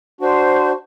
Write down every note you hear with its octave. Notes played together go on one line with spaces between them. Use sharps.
D4 F#4 C5